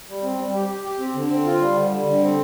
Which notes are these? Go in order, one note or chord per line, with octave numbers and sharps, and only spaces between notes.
G3
C4
G3
G4
G4
G4
C4
D3
C4
F4
G3
D3
G3
D3
C4